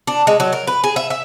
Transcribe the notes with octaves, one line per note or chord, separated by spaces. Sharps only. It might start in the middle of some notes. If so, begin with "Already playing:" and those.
D4
G#3
F#3
A#4
B4
G#4
E5
E5